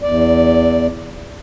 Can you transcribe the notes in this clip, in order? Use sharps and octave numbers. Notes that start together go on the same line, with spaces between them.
E2 D5